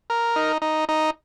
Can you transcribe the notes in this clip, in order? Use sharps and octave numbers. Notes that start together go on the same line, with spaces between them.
A#4
D#4
D#4
D#4